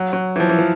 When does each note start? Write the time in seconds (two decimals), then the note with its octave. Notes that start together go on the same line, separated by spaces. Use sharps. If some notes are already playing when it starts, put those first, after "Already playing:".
Already playing: F#3
0.13 F#3
0.36 E3
0.40 F3
0.49 E3
0.59 F3